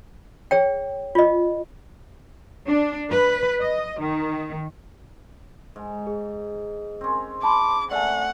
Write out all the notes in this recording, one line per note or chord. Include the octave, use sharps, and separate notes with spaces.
G#4 C#5 G5
F4 D#5
D4
B4
D#5
D#3
G#2
G#4
C4 C#4
A5 B5 C6 D6
A3 D5 F#5 G#5